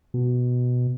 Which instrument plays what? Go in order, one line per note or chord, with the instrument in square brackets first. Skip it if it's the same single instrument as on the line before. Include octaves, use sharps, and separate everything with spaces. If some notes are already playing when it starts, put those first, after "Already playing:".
[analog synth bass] B2